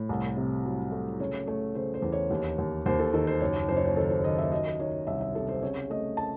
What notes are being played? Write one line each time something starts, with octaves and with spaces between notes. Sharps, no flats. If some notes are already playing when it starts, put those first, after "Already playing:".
Already playing: A2
C2
C3
F#3
A3
C#3 C#5
A3 C#5
C#3 C5
C5
E2
C#5
D#2
D#2
D#2 C5
A4
D#3 A4
C5
F#1 C#5
F#1 C5
C#5
C5
D#3 A4
C5
D#3 D#5
E5
F#3 D#5
D#3 C#5
C2 E5
E5
C3 A4
C5
C#3 C#5
A3 D#5
A5